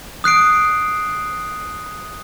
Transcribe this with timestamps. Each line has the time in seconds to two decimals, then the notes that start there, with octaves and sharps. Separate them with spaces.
0.24 D#6 F#6 C7 D7